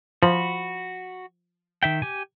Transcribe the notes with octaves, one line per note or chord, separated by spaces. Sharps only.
F3 F#4 B5
D#3 E5 G5
G4 G#5